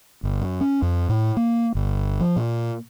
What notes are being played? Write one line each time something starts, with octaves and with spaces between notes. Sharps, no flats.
G1
F#2
C#4
F2
A2
A#3
G1
F3
A#2